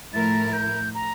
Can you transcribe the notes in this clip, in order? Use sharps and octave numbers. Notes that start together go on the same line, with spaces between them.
A2 F3 A3 E4 A#4 A6
G6
A#5